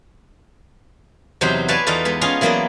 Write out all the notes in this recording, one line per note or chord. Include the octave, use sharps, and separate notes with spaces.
E2 C3 F#3 D#4 G4 C5
B4 C#5 D5 F5 G#5 A5
E2 D#4 F4 A4 D5 F5
G#3 B3
C#4 F4 G#4 D#5 F5 G#5
E3 F#3 A#3 B3 A#4 D5